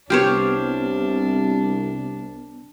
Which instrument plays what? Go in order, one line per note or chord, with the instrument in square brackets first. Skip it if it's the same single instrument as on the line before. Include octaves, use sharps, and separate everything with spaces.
[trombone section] C2 [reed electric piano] B3 F6 [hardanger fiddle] D4 [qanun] G4 C5 C#5